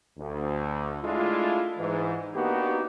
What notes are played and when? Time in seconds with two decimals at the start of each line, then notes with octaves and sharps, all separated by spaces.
0.18 D2
1.03 G#3 A3 D4 E4 F4
1.78 G#2 E3
2.35 A#3 B3 D4 D#4 F#4 G4